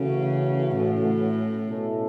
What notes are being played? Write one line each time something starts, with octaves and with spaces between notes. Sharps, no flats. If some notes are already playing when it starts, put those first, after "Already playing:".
Already playing: C#3 E3 A3 C#4 F#4
A2
B2 A3 C#4 E4 A4